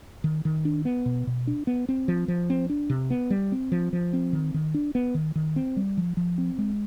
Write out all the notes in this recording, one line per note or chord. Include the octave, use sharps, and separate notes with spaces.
D#3
D#3
D4
B3
B2
B2
D4
B3
C4
F3
F3
C4
D4
C3
B3
G3
C4
F3
F3
C4
D#3
D#3
D4
B3
D#3
D#3
C4
G3
F3
F3
C4
G#3